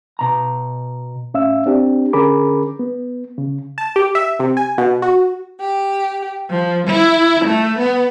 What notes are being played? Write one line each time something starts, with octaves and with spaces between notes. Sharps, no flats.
B2 A#5
A2 C#4 E5 F5 E6
C4 D4 G4
D3 C#4 G#4 A#4 B5 D6
B3
C#3
A5
G4
E5
C3
G#5
B2
F#4
G4
F3
E4
A3
B3